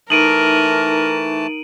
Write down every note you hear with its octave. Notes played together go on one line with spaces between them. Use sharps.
E3 A3 D#4 A#4 A5 D7 D#7 F#7